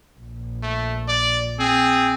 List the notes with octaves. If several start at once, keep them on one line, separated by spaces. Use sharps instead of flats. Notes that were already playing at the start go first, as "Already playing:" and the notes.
A#1
A3
D5
C4 G#4